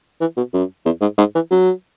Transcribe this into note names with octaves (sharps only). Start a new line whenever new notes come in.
E3
B2
F#2
E2
G#2
G#2
E3
F#3